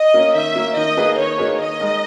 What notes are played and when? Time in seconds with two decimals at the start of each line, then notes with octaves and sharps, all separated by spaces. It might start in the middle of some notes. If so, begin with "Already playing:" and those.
Already playing: D#5
0.14 A#3 C#4
0.34 D#3 E5
0.56 A#3 C#4
0.76 D#3 D#5
0.97 A#3 D#4 G#4 B4
1.18 D#3 C#5
1.38 A#3 D#4 G#4 B4
1.59 D#3 D#5
1.80 G#3 D#4 A#4